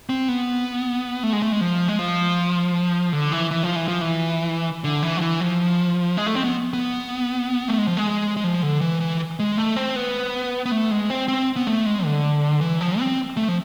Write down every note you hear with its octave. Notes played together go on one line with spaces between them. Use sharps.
C4
B3
A3
G#3
A3
G#3
F3
G#3
F3
D3
E3
E3
F3
E3
F3
E3
D3
E3
F3
E3
F3
G#3
A3
C4
B3
B3
A3
G#3
F3
G#3
G#3
F3
D3
E3
E3
G#3
A3
C4
B3
B3
A3
G#3
C4
C4
B3
A3
G#3
D3
E3
F3
C4
A3
F3